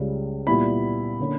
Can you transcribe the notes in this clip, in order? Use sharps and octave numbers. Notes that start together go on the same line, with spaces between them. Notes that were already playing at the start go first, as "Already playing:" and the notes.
Already playing: C#2 C#3 G3
A#2 G3 B3 E4 B5
D3 A#3 C#4